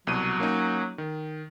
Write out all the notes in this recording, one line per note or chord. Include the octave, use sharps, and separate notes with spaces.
C2 B2 F#3 D#7
A#3 C#4 D#4
D#3